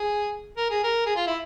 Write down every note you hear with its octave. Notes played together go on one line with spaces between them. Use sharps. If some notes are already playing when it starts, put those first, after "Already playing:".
Already playing: G#4
A#4
G#4
A#4
G#4
F4
E4